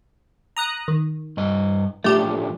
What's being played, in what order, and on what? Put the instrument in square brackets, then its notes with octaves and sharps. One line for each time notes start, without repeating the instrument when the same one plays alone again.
[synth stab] A#5 D#6 F#6
D#3
[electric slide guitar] G2 D#5
[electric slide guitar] A2 F3 D4 [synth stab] A3 G4